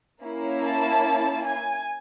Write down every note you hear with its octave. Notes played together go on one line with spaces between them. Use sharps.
A#3 C#4 E4
A5
G#5